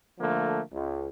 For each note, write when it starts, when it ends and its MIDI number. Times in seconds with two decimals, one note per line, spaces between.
0.19 0.61 50
0.19 0.61 53
0.19 0.61 57
0.19 0.61 58
0.72 1.08 37